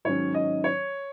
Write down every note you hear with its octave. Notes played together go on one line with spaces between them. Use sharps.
G#2 D#3 F#3 C#4 C#5
D#5
C#5